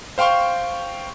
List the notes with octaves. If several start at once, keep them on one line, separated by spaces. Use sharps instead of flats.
C5 F5 G5 C6 C#6